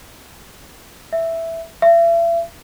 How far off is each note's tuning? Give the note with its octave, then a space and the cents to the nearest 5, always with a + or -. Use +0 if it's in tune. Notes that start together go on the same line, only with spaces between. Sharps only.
E5 +0
E5 +40